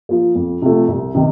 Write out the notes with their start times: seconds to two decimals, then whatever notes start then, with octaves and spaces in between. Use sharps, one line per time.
0.09 F3 A#3
0.35 F2
0.62 C3 F3 A3
0.88 C2
1.15 C3 D#3